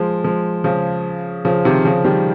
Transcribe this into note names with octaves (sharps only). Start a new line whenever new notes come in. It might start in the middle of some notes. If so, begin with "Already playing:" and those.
Already playing: F3 G#3
F3 G#3
C#3 F3
C#3 F3
C3 D#3
C#3 F3
D#3 G3